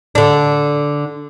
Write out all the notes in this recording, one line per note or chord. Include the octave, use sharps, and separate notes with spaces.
D3 D4